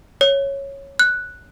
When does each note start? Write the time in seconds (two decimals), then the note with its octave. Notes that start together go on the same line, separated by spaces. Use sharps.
0.21 C#5
0.99 F#6